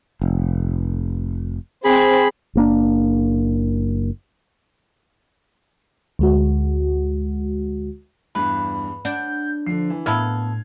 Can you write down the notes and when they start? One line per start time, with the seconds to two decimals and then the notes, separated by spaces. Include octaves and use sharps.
0.22 F1
1.85 C4 G#4 B5
2.55 F#1 A#3 D4
6.19 D2 G#3 F#4
8.35 E2 G2 B4
9.05 D4 F#5 G6
9.67 D3 F3 C7
9.90 E3
10.06 A2 A#3 B3 E4 A4 F6 G#6